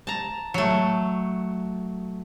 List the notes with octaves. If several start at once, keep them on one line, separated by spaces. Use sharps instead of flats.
A5 A#5
F#3 A3